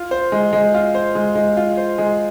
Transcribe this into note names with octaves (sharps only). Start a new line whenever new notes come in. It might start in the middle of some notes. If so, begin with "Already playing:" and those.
Already playing: F4
C5
G#3
G#3
F4
C5
G#3
G#3
F4
C5
G#3